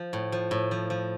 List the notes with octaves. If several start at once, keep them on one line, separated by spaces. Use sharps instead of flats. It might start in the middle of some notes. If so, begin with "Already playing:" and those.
Already playing: F3
A2
F3
A2
F3
F3